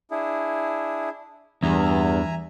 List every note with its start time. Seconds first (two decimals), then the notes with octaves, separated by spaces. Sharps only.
0.11 D4 E4 G#4
1.63 E2 G2 E5 G#5 A#5